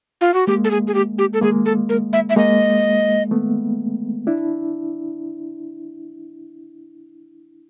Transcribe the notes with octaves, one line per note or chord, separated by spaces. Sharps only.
F4
F#4
G#3 A#3 G4
A4
G#4
G#4
G4
G4
A4
G#3 A#3 G#4
A4
A#4
E5
E5
G#3 A#3 D#5
A3 B3
D4 E4